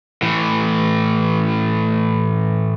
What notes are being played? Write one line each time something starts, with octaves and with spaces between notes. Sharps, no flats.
A2 E3